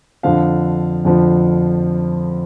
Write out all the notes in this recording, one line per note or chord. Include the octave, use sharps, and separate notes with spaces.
F2 D3 F3 F5
F2 D3 F3